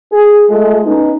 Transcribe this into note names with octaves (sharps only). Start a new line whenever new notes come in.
G#4
G#3 A3 F4 G#4 A4
B3 C#4 D#4